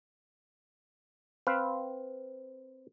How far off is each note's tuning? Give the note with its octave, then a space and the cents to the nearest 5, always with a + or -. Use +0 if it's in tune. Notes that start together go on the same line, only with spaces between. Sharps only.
C4 +0 B4 +0 F5 +0